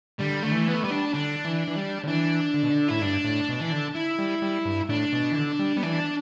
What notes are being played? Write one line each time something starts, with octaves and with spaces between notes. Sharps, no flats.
D3 G3
D3 A3
E3
B3
A3
G3 B3
D4
D3 D4
E3
E3
G3
D3
E3 D4
D3
B2
D3
A2 E4
G2 D4
A2
B2
E3
D3
E4
G3
G3
G2
A2 D4
B2
E3
D3
G3
G3 B3
E3 D4